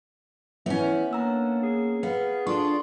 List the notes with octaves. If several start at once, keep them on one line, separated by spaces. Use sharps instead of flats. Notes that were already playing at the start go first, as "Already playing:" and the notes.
E3 B3 C#4 C#5 E5
A#3 D4 A#5 E6 F6
G#4
B3 B4 F5
D4 F4 A4 C6 C#6